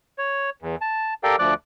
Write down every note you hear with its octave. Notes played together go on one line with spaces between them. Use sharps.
C#5
E2
A5
G4 A4 A#4 D5 F5 G5
D2 F3 D5 D6 F#6